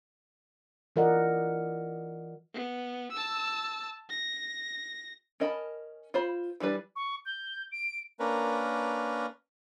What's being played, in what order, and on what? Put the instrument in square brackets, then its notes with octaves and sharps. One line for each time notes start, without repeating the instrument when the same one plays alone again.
[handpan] E3 F4 A#4 D5 D#5 F#5
[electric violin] B3
A5 E6
A#6
[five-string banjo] C#4 A#4 D#5 A5 B5
F4 C5 B5
E3 G3 D4 B4
[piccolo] C#6
G6
D7
[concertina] A#3 C#4 D4 A#4 B4